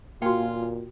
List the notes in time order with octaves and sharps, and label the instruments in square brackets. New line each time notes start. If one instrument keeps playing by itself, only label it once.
[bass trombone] A#2 [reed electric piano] A#3 F5 G#5 [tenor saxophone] F4 [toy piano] F#4 G5